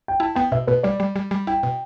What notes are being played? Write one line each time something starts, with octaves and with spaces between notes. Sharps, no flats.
G5
E4 A5
B3 G5
B2 E5
B2 B4
G3 D5
G3
G3
G3
E4 G5
B2